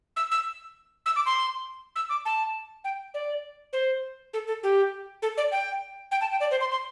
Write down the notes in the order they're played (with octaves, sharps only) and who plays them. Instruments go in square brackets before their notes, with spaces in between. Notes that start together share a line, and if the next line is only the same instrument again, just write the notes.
[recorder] E6
E6
E6
D6
C6
E6
D6
A5
G5
D5
C5
A4
A4
G4
A4
D5
G5
G5
A5
G5
D5
C5
C6
C6